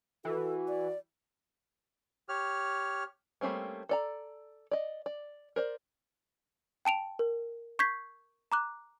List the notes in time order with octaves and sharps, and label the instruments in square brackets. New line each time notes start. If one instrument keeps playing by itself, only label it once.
[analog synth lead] E3 [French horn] F#4 [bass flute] A4
[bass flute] D5
[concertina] G4 C#5 F6
[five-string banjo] G3 A3 A#3 C4 C#4
A4 D5 A#5
D5 D#5
D5
A#4 C5 D5
[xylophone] G5 A5 D7 F7
A#4
C#6 G6 G#6 B6 C7
A#5 D6 F#6